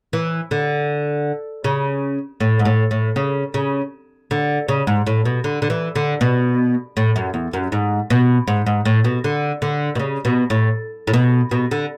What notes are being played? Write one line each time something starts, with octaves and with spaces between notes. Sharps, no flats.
E3
D3
C#3
A2
G#2
A2
A2
C#3
C#3
D3
C#3
G#2
A2
B2
D3
D3
E3
D3
B2
A2
F#2
E2
F#2
G#2
B2
G#2
G#2
A2
B2
D3
D3
B2
C#3
B2
A2
A2
B2
B2
D3